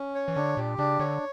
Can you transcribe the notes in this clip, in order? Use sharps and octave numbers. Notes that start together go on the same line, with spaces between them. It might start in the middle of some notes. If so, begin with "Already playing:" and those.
Already playing: C#4
C#5
E3
D3 D4
A#2 G4
C#3 D4
D3 C#5